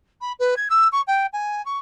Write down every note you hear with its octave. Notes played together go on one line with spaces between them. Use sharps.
B5
B4
G#6
E6
C#6
G5
G#5
C#6